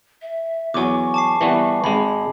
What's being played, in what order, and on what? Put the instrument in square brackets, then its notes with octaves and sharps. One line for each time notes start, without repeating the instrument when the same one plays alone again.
[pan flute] E5
[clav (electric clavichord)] E2 F#3 [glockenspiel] G#5 D6 [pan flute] C#6
[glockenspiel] A5 D6 C7
[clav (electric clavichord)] E3 G3 B3
[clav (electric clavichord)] G#1 G#3 [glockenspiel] B5